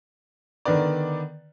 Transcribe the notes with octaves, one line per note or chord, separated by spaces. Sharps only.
D3 D#3 B3 B4 D5